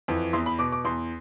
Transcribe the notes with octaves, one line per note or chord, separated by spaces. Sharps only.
F2 E3
E2 C6
B5
B2 D6
D6
E2 C6